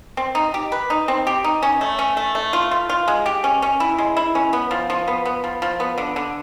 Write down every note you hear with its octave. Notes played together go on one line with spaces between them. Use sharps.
C4
D#4
G4
B4
D#4
C4
G4
D#4
C#4
A3
C#4
A3
A3
F4
F4
F4
G#3
G4
C#4
C#4
E4
G#3
E4
C#4
B3
F3
F3
B3
B3
F3
F3
B3
D3
D3